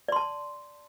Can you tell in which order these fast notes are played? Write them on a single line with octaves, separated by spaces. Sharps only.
D5 C6 A5